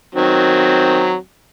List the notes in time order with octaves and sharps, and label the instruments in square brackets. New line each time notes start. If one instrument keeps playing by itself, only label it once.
[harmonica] D#3 F#3 C4